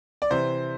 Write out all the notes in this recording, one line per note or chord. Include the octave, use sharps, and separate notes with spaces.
D5
C3 E3 C5